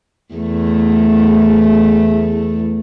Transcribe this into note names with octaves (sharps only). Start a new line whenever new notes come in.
E2 A3